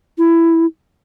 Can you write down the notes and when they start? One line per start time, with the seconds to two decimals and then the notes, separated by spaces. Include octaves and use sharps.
0.18 E4